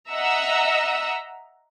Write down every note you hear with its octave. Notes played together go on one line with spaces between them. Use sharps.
D#5 E5 F#5 A#5 E6